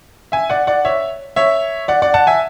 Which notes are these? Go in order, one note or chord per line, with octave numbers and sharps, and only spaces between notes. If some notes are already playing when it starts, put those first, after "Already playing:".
E5 G#5
D5 F#5
D5 F#5
C#5 E5
C#5 E5
D5 F#5
D5 F#5
F#5 A5
E5 G#5